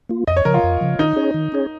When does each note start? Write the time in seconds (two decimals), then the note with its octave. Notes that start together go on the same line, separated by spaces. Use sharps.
0.09 A#3 F4
0.27 F2 D#5
0.37 C#5
0.45 C#3 F3 A#4
0.54 F4
0.63 F2
0.81 C#3 F3
0.99 D#3 D#4
1.16 C#4 G#4 C#5
1.34 D#3
1.52 C#4 G#4 C#5